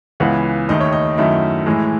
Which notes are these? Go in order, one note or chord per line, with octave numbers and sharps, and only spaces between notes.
C#2 C#3 E3 B3 F#5
D#2 D#3 A3 D#4 D#5
C#5
D#5
F#2 D#3 A3 E4
A2 E3 G#3